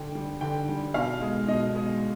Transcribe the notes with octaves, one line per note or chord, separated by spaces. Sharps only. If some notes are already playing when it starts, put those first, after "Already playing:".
Already playing: D3 G5
G3
D3 G5
G3
B2 F5
G#3
B2 D#5
G#3